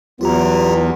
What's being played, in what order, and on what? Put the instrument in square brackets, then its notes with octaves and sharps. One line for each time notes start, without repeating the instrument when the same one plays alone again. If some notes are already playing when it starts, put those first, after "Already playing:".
[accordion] E2 [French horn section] F#3 G3 B3 [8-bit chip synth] F4 G4 A#5